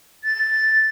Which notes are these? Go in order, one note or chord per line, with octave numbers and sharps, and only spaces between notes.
A6